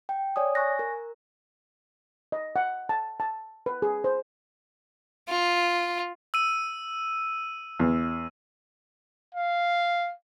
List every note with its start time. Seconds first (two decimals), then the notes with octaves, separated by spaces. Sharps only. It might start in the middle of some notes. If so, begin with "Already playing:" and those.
0.09 G5
0.36 C#5 D5 G#5 D#6
0.55 G#5 C#6 F#6 A#6
0.79 A#4
2.32 D#5
2.56 F#5
2.89 A5
3.20 A5
3.66 B4
3.82 G#4
4.04 C5
5.29 F4
6.34 E6 D#7
7.80 E2
9.35 F5